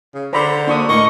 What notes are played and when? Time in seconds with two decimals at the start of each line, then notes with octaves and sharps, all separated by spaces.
0.14 C#3
0.33 D3 C5 A#5 B5
0.67 A#3 D4 D#4 F#4 C#6 D#6
0.89 A2 A#4 D#5 C#6